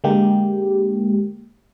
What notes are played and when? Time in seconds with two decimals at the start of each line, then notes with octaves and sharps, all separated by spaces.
0.04 D3 G#3 A#3 G4